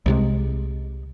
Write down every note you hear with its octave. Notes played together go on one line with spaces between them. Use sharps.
C2 C3 G#3